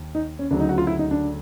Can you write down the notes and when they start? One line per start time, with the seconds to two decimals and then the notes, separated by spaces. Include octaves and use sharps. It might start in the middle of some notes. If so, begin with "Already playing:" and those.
Already playing: D#2
0.15 D#4
0.39 C#4
0.51 D2 C#3 F#3 D4
0.60 D#4
0.69 F#4
0.78 F4
0.87 E4
0.99 D#4
1.11 D4